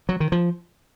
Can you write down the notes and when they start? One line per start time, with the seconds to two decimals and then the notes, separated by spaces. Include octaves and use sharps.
0.09 F#3
0.20 D#3
0.32 F3